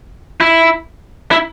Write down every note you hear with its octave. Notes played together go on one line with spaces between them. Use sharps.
E4
E4